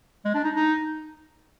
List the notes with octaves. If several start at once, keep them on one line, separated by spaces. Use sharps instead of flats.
G#3
D4
D#4
D#4